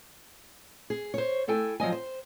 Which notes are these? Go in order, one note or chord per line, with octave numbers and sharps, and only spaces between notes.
G#4
C5 C#5
A3 E4 A4 G5 G#5
F3 F#3 D#5 G#5
C5